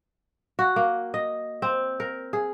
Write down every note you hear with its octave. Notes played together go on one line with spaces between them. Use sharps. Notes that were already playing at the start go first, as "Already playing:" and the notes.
F#4
A#3
D#5
C4
A#4
G#4